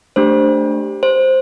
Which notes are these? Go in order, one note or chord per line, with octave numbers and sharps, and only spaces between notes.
A3 D4 G4 C5
C5